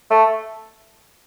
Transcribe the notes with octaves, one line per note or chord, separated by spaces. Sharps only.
A3